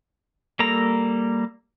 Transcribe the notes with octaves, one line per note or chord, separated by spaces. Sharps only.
G3 A#3 A4 A#5